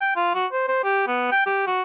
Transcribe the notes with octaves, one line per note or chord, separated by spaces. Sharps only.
G5
F4
F#4
C5
C5
G4
B3
G5
G4
F#4